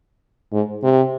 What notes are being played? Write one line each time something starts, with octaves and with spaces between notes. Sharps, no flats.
G#2
C3